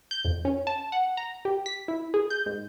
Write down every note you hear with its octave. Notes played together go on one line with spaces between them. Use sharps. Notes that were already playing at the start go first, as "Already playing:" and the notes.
G6
F2
C#4
A5
F#5
A#5
G4
B6
E4
G#4
G6
G#2